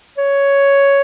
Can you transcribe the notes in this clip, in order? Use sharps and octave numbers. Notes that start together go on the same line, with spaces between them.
C#5